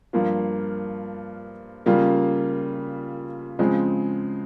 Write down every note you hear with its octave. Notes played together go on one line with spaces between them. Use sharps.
G2 F3 A#3 F4
C#3 G3 A#3 F4
C#3 F3 G#3 C4